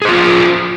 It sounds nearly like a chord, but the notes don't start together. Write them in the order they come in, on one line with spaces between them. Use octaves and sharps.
G#4 C5 F4